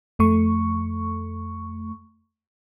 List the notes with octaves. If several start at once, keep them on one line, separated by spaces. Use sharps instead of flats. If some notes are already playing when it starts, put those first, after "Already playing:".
F2 A3 C#6